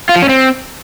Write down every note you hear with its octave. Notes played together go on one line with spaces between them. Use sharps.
F4
F3
C#4
C4